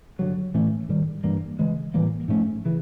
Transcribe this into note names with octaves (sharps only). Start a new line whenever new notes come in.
G2 D3 F#3
A2 E3 A3 C#4
G#2 D#3 G3
G2 E3 G3 A#3
C#3 E3 G#3
A2 E3 G3 A#3
G#2 F3 A3 C#4
C#3 E3